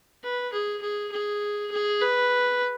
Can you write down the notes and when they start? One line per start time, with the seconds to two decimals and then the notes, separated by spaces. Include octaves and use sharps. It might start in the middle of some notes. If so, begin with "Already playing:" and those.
0.23 B4
0.52 G#4
0.81 G#4
1.12 G#4
1.71 G#4
2.01 B4